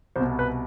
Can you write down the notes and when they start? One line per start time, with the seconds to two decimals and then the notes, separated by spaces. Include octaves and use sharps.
0.16 C2 B2 C5
0.39 B4